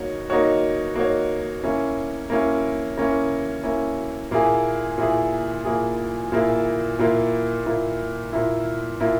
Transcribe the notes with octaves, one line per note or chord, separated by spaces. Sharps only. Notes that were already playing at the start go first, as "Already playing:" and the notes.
Already playing: A#3 D#4 F#4 C#5
A#3 D#4 F#4 C#5
A#3 D#4 F#4 C#5
A#3 C#4 E4
A#3 C#4 E4
A#3 C#4 E4
A#3 C#4 E4
A#2 A#3 E4 G#4
A#2 A#3 E4 G#4
A#2 A#3 E4 G#4
A#2 A#3 E4 G#4
A#2 A#3 E4
A#2 A#3 E4
A#2 A#3 E4
A#2 A#3 E4